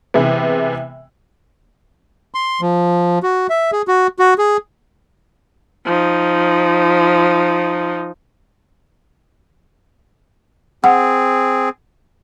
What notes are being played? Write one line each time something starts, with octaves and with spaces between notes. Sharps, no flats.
C3 E3 G#3 B3
C6
F3
F#4
E5
G#4
F#4
F#4
G#4
F3 D#4
C4 G#4 F#5